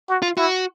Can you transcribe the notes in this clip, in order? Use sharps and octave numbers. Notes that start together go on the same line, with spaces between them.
F#4
F4
E4 F#4